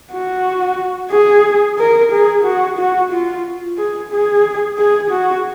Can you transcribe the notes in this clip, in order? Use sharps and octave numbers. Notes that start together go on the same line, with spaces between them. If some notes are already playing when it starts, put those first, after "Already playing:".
F#4
G#4
A#4
G#4
F#4
F#4
F4
G#4
G#4
G#4
F#4